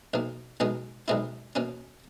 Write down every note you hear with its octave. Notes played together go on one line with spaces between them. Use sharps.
B1 B2 A#3
B1 B2 G#3 B3 D#4
B1 B2 G#3 B3 E4
B2 A#3 C#4